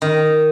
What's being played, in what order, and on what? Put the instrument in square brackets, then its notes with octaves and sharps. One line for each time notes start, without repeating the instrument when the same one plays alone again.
[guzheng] D#3